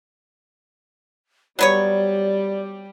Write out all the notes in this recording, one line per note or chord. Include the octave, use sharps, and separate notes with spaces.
F#3 G3 B3 C#5 D5